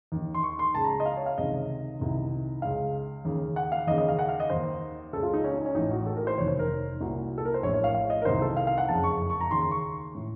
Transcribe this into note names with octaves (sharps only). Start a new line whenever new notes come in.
D#2 D#3
C6
C#6
C6
C#2 C#3 A5
A#5
D#5
F5
C#5
F5
C#2 C3 D#3 D#5
C2 C3 D#3
C#2 C#3 F5
D#2 C#3
F#5
F5
D#2 C#3 D#5
D#5
F5
F#5
F5
D#5
D#2 D#3 C5
C#2 C#3 A4
F4
D#4
C#4
D#4
C#4
A1 A2 D#4
F#4
A4
A#4
C5
F1 D#2 D#3 C#5
C5
A#4
C2 A#2 F#4
A4
A#4
C5
A#1 A2 C#5
C#5
F5
F5
D#5
A#4
C2 C3 D#3 C5
A4
F5
F5
F#5
F#1 F2 C#3 A5
C#6
C#6
A#5
D#2 C#3 C6
C6
C#6
A2